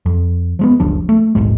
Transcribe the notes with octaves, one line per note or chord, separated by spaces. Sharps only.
F2
F3 G#3 B3
F#1 C#2 F3 D4
A3
D#1 A#1 G#2 G#3